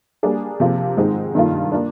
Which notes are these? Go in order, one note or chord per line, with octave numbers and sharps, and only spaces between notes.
G3 A#3 D4 G#4
C3 F3 A#3 F4
G#2 D#3 G#3 C4 D#4
G2 D#3 A#3 F4
A#3 D4